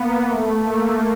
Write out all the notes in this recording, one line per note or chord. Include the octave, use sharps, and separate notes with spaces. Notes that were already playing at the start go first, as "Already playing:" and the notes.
Already playing: A#3 B3
A3
A#3